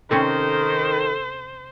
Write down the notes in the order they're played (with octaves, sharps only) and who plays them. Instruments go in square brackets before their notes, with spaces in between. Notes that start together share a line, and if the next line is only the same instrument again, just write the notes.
[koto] C3 C4 C#4 [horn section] D#3 [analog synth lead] A4 [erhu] C5